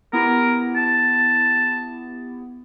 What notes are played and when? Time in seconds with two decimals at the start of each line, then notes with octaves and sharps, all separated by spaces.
0.13 B3 E4 G4 A#4
0.76 A5